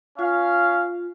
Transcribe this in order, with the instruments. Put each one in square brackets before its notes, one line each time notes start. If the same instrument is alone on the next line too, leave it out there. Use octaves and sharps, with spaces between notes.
[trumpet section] C#4 F5 [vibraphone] F4